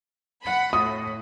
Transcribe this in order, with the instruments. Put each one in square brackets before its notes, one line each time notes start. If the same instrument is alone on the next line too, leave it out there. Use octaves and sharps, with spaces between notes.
[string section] F#5 B5
[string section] A2 [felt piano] D#6